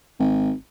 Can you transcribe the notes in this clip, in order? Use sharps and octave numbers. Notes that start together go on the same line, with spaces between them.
G#1